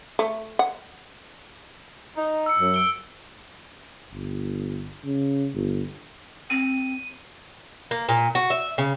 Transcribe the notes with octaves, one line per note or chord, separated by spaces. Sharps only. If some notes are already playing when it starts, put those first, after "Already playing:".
A3
F#5
D#4
E6 C#7
F#2
E6 D7 G7
G1
C#3
G1
C4 D#7
A#3
A#2
F#4
E5
C#3